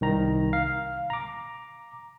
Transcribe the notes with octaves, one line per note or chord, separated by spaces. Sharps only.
C2 D#3 A#5
F5
A#5 D6